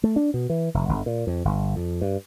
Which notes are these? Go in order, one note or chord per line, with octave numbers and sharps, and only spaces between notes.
A3
D4
B2
E3
F1
G1
A#2
F2
G1
F2
G2